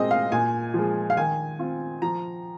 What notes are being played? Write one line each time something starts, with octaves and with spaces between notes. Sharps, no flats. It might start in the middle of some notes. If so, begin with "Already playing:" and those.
Already playing: A#2 G#3 C4 D#5
F5
A#2 G#5
F3 G#3
F5
D#3 G#5
C4 F4
F3 A#5